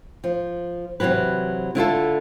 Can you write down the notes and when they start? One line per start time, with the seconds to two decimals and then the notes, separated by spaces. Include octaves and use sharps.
0.24 F3
1.00 C3 D#3 E3 F#3 B4
1.75 D3 E4 F4 A4